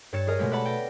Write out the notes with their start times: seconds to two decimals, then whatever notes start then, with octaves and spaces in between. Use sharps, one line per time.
0.13 G2 C#5 A6 C#7 E7
0.27 G#4 A#4 D#5
0.39 B2 G#3 A3 G4
0.51 B4 D5 E5 F#5 A5 B5
0.65 G5 A#6